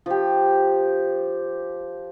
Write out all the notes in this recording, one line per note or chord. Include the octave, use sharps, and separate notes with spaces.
F3 G4